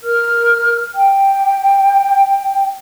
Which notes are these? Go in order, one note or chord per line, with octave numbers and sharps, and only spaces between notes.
A#4 F6
G5